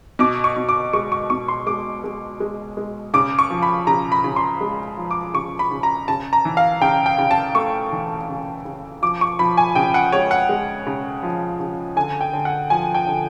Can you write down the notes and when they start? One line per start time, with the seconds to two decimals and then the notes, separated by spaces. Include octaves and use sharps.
0.19 B2 D6
0.44 C#6
0.56 B2
0.69 D6
0.93 G#3 C#6
1.12 C#6
1.30 B2 C#6
1.48 C6
1.66 G#3 D6
2.04 G#3
2.40 G#3
2.77 G#3
3.14 C#3 D6
3.39 C#6
3.50 F3
3.62 B5
3.87 C#3 A#5
4.12 B5
4.24 C#3
4.36 C6
4.61 G#3
4.97 F3
5.11 D6
5.34 C#3 C#6
5.59 B5
5.71 C#3
5.83 A#5
6.08 C#3 A5
6.33 A#5
6.45 E3
6.57 F5
6.81 C#3 G5
7.06 G5
7.19 C#3
7.31 A5
7.55 A3 C#6
7.92 E3
8.28 C#3
8.65 C#3
9.02 F3 D6
9.21 C#6
9.39 F3 B5
9.57 G#5
9.75 C#3 G5
9.94 F#5
10.12 G#3 C#5
10.31 F#5
10.49 G#3
10.87 C#3
11.23 F3
11.60 C#3
11.96 D3 G#5
12.21 G5
12.33 D3
12.45 F#5
12.70 F3 G#5
12.95 G5
13.07 D3